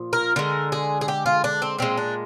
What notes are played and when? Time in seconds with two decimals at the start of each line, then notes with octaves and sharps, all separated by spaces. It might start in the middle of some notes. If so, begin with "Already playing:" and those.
Already playing: A#2 F3
0.13 A#4
0.36 D3 G#3 A#4
0.72 G#4
1.01 G#4
1.08 G4
1.26 F4
1.44 D4
1.62 C4
1.79 A#2 G#3 C4
1.98 D4